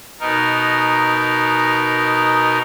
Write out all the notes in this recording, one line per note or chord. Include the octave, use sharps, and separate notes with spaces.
B2 D#4 A#4